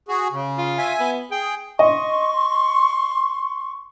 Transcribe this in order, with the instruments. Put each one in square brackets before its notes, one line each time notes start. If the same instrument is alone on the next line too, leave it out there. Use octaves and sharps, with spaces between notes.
[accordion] F#4 G#4
C#3
[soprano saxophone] F4
[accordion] E5 G#5
[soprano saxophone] B3
[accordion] G#4 [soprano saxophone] G5
[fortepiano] D#5 [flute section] C6 C#6